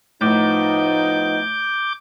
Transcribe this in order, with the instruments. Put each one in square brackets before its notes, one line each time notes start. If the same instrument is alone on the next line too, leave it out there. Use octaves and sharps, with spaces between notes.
[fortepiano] A2 [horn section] F3 B3 D#4 [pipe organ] D6 G6